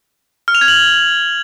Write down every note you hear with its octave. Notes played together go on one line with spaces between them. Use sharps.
F6
F7
G#6
F#7